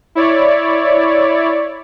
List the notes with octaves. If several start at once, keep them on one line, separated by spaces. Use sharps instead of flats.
E4 C#5 D5